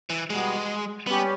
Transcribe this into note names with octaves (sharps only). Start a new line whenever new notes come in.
E3
B2 G3 G#3 B3
G3 B3 C#4 G4